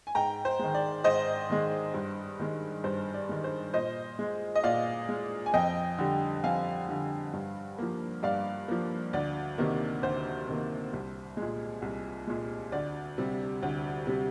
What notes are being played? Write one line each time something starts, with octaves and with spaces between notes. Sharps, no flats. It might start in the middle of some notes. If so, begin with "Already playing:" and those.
G#5
G#2 G5 A#5
C5
D#3 G#3
D5
G#2 C5 D#5
D#3 G#3
G2
D#3 G#3
G2 C5
D5
D#3 G#3
C5
A#2 C5 D#5
G#3
D#5
A#2 D5 F5
G#3
G#5
F2 D#5 G5
D3 G3
F2 F5 G#5
D3 G3
G2
F3 A#3
G2 D5 F5
F3 A#3
D2 D5
C3 D#3 A#3
D2 C5
C3 D#3 A#3
C2
A#2 G#3
C2
A#2 G#3
D2 D5
C3 G3
D2
C3 G3